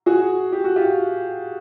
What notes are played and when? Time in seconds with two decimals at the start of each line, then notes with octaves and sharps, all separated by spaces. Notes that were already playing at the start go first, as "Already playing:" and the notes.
0.06 F#4 G#4
0.52 G4
0.64 F#4
0.76 F4 G4